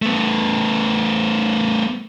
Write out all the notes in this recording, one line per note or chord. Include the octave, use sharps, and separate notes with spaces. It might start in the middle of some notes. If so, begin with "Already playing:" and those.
A3 B3